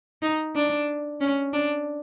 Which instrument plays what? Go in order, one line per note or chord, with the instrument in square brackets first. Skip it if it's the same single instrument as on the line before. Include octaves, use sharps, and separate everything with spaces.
[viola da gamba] D#4
D4
C#4
D4